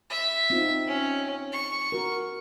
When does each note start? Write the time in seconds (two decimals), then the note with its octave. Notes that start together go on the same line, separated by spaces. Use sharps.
0.10 E5
0.50 C4 D#4 F4
0.87 C#4
1.52 C#6
1.92 F#4 A#4